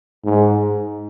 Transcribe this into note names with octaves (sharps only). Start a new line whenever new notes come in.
G#2